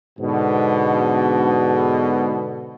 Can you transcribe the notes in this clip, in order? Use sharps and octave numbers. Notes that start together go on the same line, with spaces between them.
G#2 B2 D3